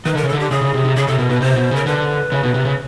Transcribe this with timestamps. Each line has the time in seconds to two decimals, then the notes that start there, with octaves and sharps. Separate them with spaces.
0.05 D#3 B4
0.15 D3 A#4
0.23 C#3
0.29 D3 A4
0.40 G4
0.51 C#3 G#4
0.62 C#3
0.74 C3
0.85 C3
0.96 C#3 G#4
1.07 C3 A4
1.18 B2 A#4
1.29 B2 B4
1.41 C3 C5
1.56 B2
1.71 C#3 A#4
1.86 D3 B4
2.32 C#3
2.43 B2
2.54 C3
2.65 C#3